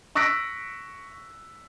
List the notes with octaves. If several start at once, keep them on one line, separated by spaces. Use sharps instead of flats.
C#6 E6 F#6 A#6 B6 D7